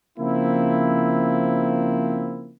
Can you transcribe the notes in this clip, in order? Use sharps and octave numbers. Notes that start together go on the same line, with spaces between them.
C#3 F3 A#3 C4 E4